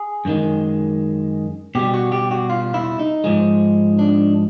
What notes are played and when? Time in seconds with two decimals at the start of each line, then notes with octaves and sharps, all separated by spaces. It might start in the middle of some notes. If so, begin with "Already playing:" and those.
Already playing: G#4
0.25 F#2 D#3 G#3
1.75 B2 G3 G4
1.94 F#4
2.12 G4
2.31 F#4
2.50 F4
2.74 E4
2.99 D#4
3.24 G#2 F3 G#3
3.99 D4